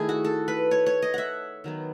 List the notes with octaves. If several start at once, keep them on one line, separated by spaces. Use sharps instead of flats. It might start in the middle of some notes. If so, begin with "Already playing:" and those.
Already playing: D#3 A3 E4 G#4
F#4
A4
B4
C#5
C#5
D#5
E5 F#5
D#3 F#3 B3